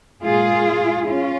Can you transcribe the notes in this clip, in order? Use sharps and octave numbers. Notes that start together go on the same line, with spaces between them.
A#2 G#3 F4 G#4
C#4 F4